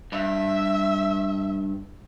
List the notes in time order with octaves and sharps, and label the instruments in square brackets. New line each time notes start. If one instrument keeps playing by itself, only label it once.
[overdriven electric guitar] G2 [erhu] E5